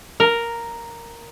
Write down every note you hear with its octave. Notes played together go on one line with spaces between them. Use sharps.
A#4